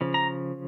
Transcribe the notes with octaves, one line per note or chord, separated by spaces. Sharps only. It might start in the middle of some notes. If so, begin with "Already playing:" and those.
C#3 F3
A#5